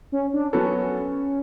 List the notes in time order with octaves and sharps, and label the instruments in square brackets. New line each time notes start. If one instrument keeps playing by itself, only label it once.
[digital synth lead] C#4
D4
[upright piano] F#3 B3 F#4 A4 [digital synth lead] C#4